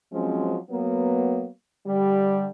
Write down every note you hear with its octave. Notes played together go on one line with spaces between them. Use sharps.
F3 F#3 G#3 C4 C#4
F#3 A#3 B3
D3 G3